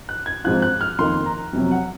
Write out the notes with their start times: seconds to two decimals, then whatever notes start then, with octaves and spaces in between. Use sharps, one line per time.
0.09 F#6
0.26 G#6
0.44 G#2 F3 C4 F4 F#6
0.62 F#6
0.81 F6
0.99 F2 D#3 A#3 D#4 C6
1.26 A#5
1.53 F2 C3 F#3
1.71 F#5